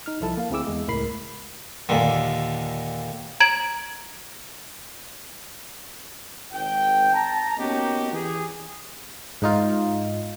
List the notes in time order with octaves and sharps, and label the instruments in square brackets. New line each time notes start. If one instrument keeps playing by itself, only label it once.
[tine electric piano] D#4 F6
C2 F3 E4 A4 A5
A#3 F5
D2 C4 E4 G#4 D6 E6
E2 G#3
C#2 A2 A#4 B5 C7
[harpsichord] D#2 A#2 D3
[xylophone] A#5 G#6 D7 F#7
[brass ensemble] G#1 G5
A5 A#5
A#3 B3 C#4 D#4 F#4 G4
E3 G4 G#4
[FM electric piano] G#2 D#4 F4